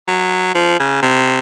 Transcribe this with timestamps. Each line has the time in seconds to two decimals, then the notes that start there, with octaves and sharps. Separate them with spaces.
0.08 F#3
0.54 F3
0.80 C#3
1.02 C3